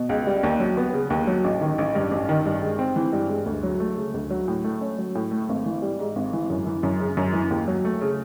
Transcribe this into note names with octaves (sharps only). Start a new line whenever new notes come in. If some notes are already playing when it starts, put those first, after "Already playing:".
Already playing: B2
C#2
G3
D#2
F#3
B3
C#3
D#2
F#3
A1
D#3
A1
G2
A1
D#3
G2
G#3
C4
E3
G2
G#3
D2
F#3
A3
C#3
D2
F#3
A2
A3
C#4
F#3
A2
A3
G#1
E3
G3
G#2
G#1
E3
F#2
E3
F#2
C#3
F#2
E3
D#2
F#3
A3
C#3